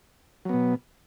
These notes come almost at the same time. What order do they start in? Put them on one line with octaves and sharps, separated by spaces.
F#3 B3 B2